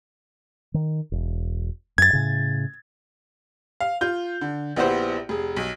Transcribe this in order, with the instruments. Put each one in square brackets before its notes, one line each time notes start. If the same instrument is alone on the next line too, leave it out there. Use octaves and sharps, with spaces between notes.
[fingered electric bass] D#3
E1
[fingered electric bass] F#2 [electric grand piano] G#6 A6
[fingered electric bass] A2 C#3
[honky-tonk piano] F5
F4 G6
D3
A#1 B3 E4 G4 C5
F1 G#4
B1